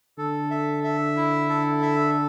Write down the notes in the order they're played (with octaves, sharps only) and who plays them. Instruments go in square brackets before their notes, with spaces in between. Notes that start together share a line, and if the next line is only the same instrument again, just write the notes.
[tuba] D3 [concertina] A4
[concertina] E5
E5
E4
A4
E5